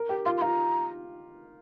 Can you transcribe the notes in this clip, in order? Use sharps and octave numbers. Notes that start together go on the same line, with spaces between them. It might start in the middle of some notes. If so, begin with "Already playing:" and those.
Already playing: A#4
G4 G5
F4 C6
C6
F4 A#5